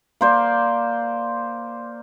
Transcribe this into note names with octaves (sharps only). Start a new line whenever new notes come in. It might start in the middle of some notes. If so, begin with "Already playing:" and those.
A#3 C5 D5